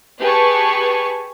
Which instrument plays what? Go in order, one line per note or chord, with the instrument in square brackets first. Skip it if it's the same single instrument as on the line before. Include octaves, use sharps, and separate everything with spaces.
[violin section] G4 G#4 B4 G#5 A5 C#6